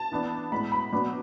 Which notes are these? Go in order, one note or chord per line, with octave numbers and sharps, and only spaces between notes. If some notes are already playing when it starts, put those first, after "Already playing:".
Already playing: A5
E3 B3 D4
A2 G#3 B3 B5
B5
B2 F#3 B3 D4